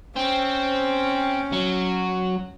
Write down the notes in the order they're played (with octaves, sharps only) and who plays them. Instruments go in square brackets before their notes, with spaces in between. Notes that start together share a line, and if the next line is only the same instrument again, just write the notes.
[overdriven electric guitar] C4 [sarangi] C#4
[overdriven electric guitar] F#3